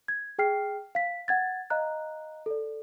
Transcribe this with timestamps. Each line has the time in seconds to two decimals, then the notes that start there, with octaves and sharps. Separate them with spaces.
0.08 G#6
0.39 G#4 G5 F6 C7
0.95 F5 B6
1.28 F#5 G#6 A6
1.70 D#5 F5 A#5 F#6
2.46 A4 D5